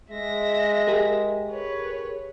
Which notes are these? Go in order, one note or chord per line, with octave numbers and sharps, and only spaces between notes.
G#3 E5 A#6
G4 G#4 A#4
B4 C#5